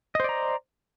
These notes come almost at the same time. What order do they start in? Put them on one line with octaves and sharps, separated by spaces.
D#5 C5 D5 A#5